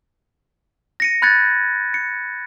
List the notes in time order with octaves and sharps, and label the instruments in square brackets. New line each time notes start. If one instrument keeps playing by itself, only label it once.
[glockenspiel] A#6 C#7 D#7
B5 F#6 G#6 A6 C#7
C#7